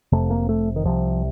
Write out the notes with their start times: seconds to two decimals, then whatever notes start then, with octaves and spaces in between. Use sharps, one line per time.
0.12 F1 F2 C3 A3
0.30 A#3
0.49 A3
0.76 D#3
0.85 C2 C3 F3